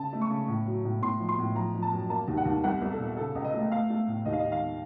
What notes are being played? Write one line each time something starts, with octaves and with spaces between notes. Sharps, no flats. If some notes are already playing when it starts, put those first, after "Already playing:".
Already playing: C#3 A5
A3
C#6
C#3
A2
F#3
A2
A2 C6
F3
C6
A2
F3 A#5
F3
A5
F#2
A#3 A5
D#2
F#5
D#2
C2 F#5
C2
A4
A#2
C#3 A4
C#2
D#5
A3
A3 F5
A3
A2
D#2 D#5
F5
D#3 D#5
F5